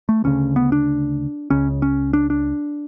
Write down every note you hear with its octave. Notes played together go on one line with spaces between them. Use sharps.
A3
D2 C#3 C#4
B3
D4
C#2 C#3 C#4
C#4
D4
D4